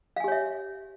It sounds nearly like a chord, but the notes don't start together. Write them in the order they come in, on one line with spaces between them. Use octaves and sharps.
F5 G#5 G4 C#5 E5